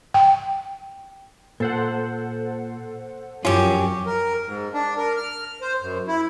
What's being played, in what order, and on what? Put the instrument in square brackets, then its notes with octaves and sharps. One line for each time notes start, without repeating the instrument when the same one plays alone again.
[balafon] G5
[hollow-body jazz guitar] A#2 [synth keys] A4 C5 F#5
[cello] F#2 [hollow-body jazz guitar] F3 F4 [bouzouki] C#4 G4
[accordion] A#4
G#2
D4
A#4
F6
C5
F#2
E4